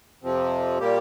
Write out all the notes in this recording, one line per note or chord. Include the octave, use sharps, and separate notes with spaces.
F2 C3 F3 C4
A#2 G3 A#3 G4